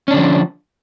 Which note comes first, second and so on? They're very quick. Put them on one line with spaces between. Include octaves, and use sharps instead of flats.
C#4 D4 D3 F3